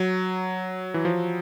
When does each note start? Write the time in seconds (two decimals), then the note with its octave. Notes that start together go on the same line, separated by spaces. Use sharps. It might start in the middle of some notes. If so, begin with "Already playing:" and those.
Already playing: F#3
0.94 E3
1.05 F3